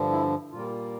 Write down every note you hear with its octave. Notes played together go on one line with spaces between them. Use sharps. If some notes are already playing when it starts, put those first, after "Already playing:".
Already playing: G2 D3 F3
E4
A#2 G3 A#3 F4